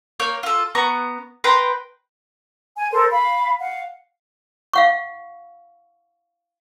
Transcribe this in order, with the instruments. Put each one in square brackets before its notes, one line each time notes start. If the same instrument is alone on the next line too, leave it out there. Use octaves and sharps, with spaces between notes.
[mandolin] A#3 C#5 G6
F4 A4
B3 A#5 C#6
B4 G5 A#5 C6
[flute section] G#5
A4 A#4 C5
F5 B5
F5 F#5
[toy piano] F5 F#5 C#6